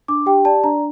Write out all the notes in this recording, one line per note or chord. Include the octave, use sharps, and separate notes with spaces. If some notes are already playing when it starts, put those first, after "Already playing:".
D4 D6
G4 G5
D5 A5
D4 A#5